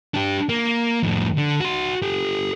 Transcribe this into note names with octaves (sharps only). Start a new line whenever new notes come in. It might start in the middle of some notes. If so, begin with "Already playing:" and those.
D4 G4
A#3
F2 A2
D3
F#4 C6
G4 A4